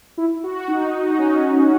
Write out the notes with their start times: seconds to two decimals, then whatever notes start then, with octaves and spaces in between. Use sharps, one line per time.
0.18 E4
0.44 F#4
0.68 D#4
0.93 D#4
1.10 D#4
1.19 C#4